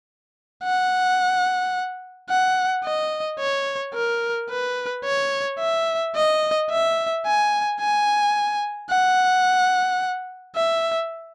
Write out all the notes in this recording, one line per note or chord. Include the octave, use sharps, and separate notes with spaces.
F#5
F#5
D#5
C#5
A#4
B4
C#5
E5
D#5
E5
G#5
G#5
F#5
E5